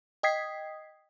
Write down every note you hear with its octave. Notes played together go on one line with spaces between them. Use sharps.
D#5 G5 D#6 G#6 B6 C7